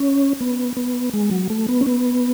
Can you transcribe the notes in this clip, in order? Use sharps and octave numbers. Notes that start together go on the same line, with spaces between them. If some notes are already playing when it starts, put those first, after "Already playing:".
Already playing: C#4
B3
B3
G#3
F#3
A3
B3
C#4
B3